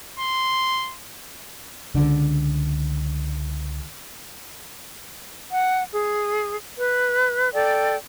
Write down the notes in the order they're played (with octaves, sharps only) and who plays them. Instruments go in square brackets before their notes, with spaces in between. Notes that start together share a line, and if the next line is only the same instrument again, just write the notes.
[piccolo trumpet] C6
[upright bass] C#2 D3
[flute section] F#5
G#4
B4
A4 D5 G5